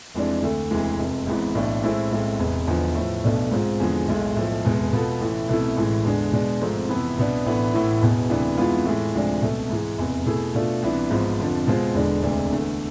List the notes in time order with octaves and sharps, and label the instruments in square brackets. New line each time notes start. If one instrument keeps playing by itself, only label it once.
[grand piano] F1 F2 E3 G#3 D4
D2 D3 A3
E1 D2 C3 E3 G#3
F1 F2 C3
G#1 G#2 E3 B3
B1 A2 E3 A3 D4
A1 A2 G#3 C4 E4
B1 A2 G#3 C4
E1 E2 C3
E1 E2 D3 F3
A2 F3 A3
B1 B2 A3 D4
G#2 G#3 C4 F4
E2 D3 F3 G#3
B1 A2 G#3
B1 A2 F3
F1 E2 B2 G#3
B2 B3 F4 A4
A1 A2 E3
C2 B2 A3 E4
A1 A2 E3 G#3
E2 D3 G#3 D4
B2 G#3 D4
G#1 G#2 F3 A3 C4
F2 C3 E3 B3 E4
C2 B2 B3 D4
A1 A2 E3 B3 D4
A1 A2 E3 B3 E4
E1 E2 B2
D2 C3 E3 B3 D4
F2 E3 G#3 B3 F4
A2 E3 G#3
D2 C3 F3 G#3 D4
C2 B2 A3
G#2 E3 G#3
F1 E2 C3
B2 A3 E4 G#4
B2 A3 D4 F4
C2 C3 E3 B3 D4
G#1 G#2 F3 B3
F1 F2 D3 F3
B2 G#3 C4 F4
E1 E2 D3 G#3 D4
E1 D2 C3 G#3 D4
E2 D3 A3